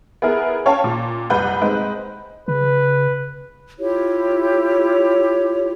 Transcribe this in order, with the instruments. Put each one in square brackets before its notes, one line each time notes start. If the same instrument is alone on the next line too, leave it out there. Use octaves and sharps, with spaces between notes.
[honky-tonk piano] B3 E4 G#4 A#4
C#4 C#5 F5 G5 A5
A#2
F#1 C2 G3 B4 F#5 G6
G#3 C4 D#4 B4
[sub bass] C#3 [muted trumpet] B4
[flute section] E4 F4 G4 C#5